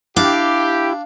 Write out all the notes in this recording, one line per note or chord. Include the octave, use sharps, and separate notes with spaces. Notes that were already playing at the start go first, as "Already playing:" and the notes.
D4 E4 G4 F5